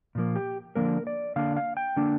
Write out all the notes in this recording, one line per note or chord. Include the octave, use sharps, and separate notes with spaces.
A#2 F3 A#3
G4
D3 F3 A#3 D4 A#4
D5
D3 A#3 D4 F5
F5
G5
D3 A#3 D4